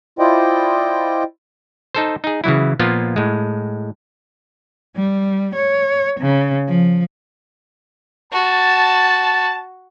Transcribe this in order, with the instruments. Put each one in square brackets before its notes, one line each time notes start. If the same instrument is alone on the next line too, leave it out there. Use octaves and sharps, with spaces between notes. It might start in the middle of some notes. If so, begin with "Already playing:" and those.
[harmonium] E4 F4 C5 D5 D#5 G5
[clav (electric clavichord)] D#4 A4 C5
D#4 G#4
C#3 E3 F#3 E4
A#2 F3 A#3 B3 F4
A2 G#3
[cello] G3
C#5
C#3
F3
[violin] F#4 [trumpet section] A5